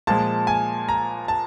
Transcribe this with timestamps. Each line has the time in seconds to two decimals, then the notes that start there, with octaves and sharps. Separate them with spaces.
0.07 A#2 F3 G#3 A5
0.47 G#5
0.89 A#5
1.28 A5